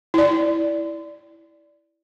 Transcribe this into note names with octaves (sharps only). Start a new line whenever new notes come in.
E4 D5